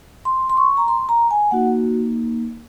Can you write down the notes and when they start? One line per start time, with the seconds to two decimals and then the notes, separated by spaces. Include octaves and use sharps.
0.25 C6
0.50 C6
0.57 C#6
0.77 A#5
0.88 C6
1.09 A#5
1.31 G#5
1.51 A#3 D#4 F#4 F#5